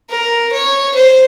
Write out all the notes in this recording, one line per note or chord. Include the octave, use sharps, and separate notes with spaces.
A#4
C#5
C5